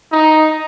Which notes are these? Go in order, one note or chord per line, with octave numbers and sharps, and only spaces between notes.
D#4